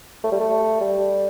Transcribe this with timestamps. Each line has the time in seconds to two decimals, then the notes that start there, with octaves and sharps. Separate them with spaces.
0.24 A3
0.32 G3
0.40 A3
0.81 G3